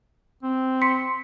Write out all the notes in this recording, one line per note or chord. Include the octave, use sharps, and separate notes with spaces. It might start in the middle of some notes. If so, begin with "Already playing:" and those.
C4
C6 B6 C#7